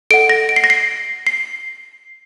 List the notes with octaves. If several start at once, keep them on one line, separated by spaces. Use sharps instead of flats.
A4 D#5 F#5 D7
A#6
D7
C7
A#6
C7
C7